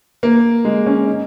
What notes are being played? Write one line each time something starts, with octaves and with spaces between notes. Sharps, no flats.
A#3
G#3
C#4
D#4